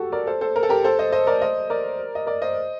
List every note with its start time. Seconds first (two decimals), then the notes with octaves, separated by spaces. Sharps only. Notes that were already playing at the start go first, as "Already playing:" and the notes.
Already playing: F#4 G4 A4
0.12 A#4 D5
0.27 A4 C5
0.41 A4 C5
0.56 A#4
0.63 A4
0.69 G4 A#4
0.84 A4 C5
0.99 C5 D#5
1.12 C5 D#5
1.27 A#4 D5
1.41 C5 D#5
1.70 A#4 D5
2.15 D#5
2.26 A#4 D5
2.42 C5 D#5